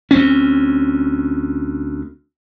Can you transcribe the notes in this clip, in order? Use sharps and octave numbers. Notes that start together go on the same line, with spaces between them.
D2 C4 C#4